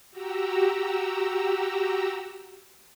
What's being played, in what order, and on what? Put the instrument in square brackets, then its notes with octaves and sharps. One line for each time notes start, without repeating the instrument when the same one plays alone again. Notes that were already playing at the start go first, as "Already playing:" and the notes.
[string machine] F#4 G4 A#5 E6